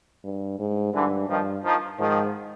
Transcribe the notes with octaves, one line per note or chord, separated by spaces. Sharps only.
G2
G#2
G2 D3 E3
G2 D#3 F3
D#3 F3
G#2 D#3 F3